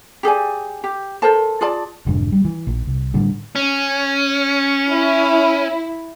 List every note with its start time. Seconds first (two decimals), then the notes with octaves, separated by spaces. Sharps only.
0.23 G4 G#4 D5 G#5
0.84 G4
1.22 A4 A#4 C5 A5
1.61 F4 G#4 D5 A5
2.06 F1 F2 G#2 D3
2.32 G3
2.45 E3
2.67 A#1
2.87 C2
3.14 A2 D3 G3
3.56 C#4
4.92 E4